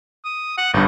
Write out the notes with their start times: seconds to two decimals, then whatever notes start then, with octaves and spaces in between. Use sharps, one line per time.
0.25 D#6
0.57 F#5
0.74 G1 G2 D#4